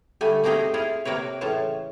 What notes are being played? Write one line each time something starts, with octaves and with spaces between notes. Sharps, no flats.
D3 G3 A3 G#5
A3 A#3 C4 D#4 G4 G#4
E4 F4 G#4
C3 A#3 A#4 B4 C#5
A2 C#3 E3 F4 C#5 A5